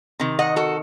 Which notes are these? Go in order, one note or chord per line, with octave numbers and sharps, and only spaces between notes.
C3 D#3
D#5 F#5
F#4 A4